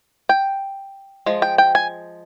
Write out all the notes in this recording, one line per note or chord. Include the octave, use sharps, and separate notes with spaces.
G5
F3 G#3
G5
G5
G#5